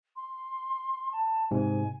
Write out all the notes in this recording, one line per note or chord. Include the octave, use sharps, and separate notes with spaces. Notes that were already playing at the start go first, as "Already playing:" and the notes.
C6
A5
G#2 C3 G#5